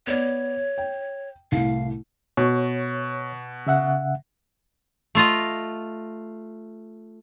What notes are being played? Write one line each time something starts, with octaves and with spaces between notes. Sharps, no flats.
B3 C#5 D5
G5
C2 A2 F5
B2 C#5
C#3 E5 F#5
A3 F4 D#5